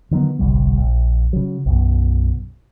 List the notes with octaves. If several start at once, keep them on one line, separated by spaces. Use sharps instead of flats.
D3 D#3 F#3 B3
D1 G1 C2 G3
A#1
C#3 F#3
B1 F#2 B2